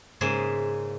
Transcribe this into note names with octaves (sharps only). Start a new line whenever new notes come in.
G#2 C#3 A#3 G#4 E5 C6